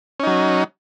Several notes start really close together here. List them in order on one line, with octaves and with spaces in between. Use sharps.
C#4 D#4 F#3